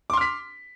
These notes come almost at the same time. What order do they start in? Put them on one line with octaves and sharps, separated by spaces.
D6 C6 F6 B6